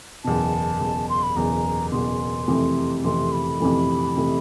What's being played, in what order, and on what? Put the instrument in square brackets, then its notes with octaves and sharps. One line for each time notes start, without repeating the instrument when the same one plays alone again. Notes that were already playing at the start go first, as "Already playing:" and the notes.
[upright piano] F#1 E2 B2 [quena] A5
[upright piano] F#1 E2 B2
[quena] C6
B5
[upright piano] F#1 E2 B2 [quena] A#5
[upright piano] F#1 E2 B2 [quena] C6
[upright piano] F2 C3 E3 A3
[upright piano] F2 C3 E3 A3 [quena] C6
[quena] B5
[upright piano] F2 C3 E3 A3
C3 E3 A3